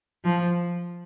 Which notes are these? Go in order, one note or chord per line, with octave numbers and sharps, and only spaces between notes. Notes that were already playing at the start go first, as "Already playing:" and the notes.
F3